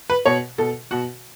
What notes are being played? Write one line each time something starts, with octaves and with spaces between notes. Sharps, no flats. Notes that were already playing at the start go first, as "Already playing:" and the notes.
B4
B2 C#5
B2 A4
B2 F#4